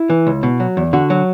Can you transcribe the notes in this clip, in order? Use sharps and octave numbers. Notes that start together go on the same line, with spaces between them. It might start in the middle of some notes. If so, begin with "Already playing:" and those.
Already playing: E4
E3
C#2
B2
F#3
E2
D3 F#4
F#3